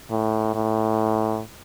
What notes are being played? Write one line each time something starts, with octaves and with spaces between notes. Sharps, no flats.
A2
A2